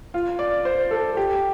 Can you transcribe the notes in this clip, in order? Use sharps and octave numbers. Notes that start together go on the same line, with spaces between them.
F4
D5
C5
A4
G4